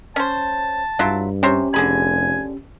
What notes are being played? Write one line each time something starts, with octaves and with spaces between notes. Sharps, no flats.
C#4 C5 A5
G2 F#3 E4 F4
C3 C#4 G4 C5 C#5
F1 D3 G#4 G#5 B5